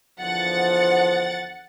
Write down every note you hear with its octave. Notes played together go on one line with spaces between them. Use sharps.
E2 D3 F3 F#5 A6